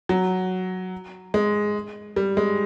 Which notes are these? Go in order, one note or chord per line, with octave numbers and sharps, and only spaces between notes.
F#3
G#3
G3
G#3